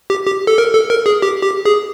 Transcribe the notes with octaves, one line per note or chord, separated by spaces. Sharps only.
G4
G4
A4
A#4
A4
A#4
G#4
G4
G4
G#4